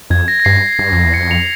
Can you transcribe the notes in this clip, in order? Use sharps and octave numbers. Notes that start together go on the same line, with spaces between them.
F2 G#6
A#6
A#6
G2 C7
G2
F2
E2
A#6 C#7
F2
C#7 F7